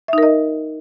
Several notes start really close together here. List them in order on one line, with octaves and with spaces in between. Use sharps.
E5 D#4 A#4 D#5